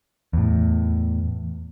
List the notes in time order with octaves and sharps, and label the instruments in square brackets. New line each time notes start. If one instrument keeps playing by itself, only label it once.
[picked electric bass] E2 A2